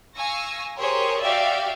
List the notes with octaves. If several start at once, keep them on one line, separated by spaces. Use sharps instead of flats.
F5 G#5 C#6 E6 A#6
G4 G#4 A#4 C5 C#5
F#4 G4 D5 E5 F5 G5